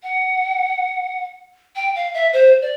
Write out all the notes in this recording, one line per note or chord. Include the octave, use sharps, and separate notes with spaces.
F#5
G5
F5
E5
C5
D5